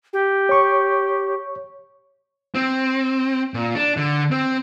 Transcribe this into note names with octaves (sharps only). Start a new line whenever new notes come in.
G4
C#5 C#6
C4
A#2
D4
D3
C4